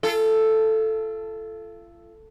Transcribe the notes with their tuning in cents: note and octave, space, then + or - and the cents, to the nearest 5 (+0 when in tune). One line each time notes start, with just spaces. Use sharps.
F4 -35 A4 +0